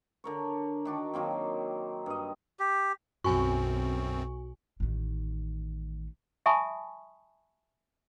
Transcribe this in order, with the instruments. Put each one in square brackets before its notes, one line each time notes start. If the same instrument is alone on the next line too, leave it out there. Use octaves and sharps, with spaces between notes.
[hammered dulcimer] D3 A#4 C#5
D#3 D4 F#4
D#3 F#3 A#3 C4
G2 D#5
[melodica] G4
[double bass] B1 [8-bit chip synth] F#2 C4 [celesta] F#4 [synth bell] G#5 C#6
[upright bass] A1 D#3
[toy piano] E5 G#5 A5 B5 C#6 D#6